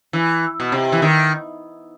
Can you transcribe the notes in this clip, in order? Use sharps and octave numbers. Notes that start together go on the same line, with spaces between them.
E3
B2
C3
E3
D#3